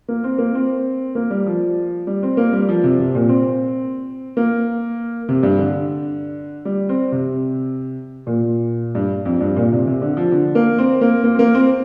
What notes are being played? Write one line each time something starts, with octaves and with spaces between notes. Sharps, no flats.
A#3
C4
A#3
C4
A#3
G3
F3
G3
C4
A#3
G3
F3
C3
C3
A#2
C4
A#3
C3
G2
D3
G3
C4
C3
A#2
G2
F2
G2
A#2
C3
C3
D3
F3
D3
A#3
C4
A#3
A#3
C4
A#3
C4